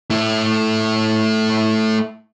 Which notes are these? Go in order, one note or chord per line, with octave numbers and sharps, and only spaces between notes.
A3 E4